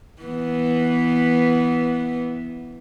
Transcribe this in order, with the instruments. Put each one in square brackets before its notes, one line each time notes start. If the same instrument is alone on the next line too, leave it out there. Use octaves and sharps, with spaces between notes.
[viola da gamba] E3 B3